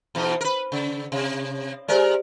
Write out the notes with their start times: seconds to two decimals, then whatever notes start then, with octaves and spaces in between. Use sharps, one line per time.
0.15 E2 B2 D#4
0.41 A#4 B4
0.72 C#3
1.12 C3
1.88 G#3 G4 A#4 C5 D5